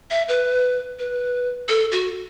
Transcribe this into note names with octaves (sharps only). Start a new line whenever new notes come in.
E5
B4
B4
A4
F#4